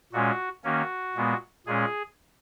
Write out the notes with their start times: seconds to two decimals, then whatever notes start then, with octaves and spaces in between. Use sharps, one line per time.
0.13 A#2 G#3 C#4 F#4
0.64 D#3 A#3 C#4 F#4
1.16 A#2 G#3 B3
1.67 A#2 G#3 C#4 G#4